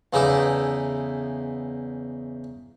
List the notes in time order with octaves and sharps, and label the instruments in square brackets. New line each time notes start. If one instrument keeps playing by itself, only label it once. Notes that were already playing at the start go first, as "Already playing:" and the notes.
[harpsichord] E2 C#3 D#4 E4 A4 D6